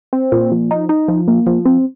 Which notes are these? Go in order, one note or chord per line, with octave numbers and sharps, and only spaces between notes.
C4
A#2
F3
D#4
D#4
F3
A#3
F3
C4